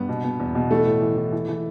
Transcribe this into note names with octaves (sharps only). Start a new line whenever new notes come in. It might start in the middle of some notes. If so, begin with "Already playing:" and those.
Already playing: G2 B3
B2
B2
E2
B2
E3 A3
A2
E3
E3
E3
E3